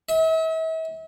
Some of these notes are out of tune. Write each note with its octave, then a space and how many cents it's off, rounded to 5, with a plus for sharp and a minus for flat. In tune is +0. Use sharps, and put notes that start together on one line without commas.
E5 -40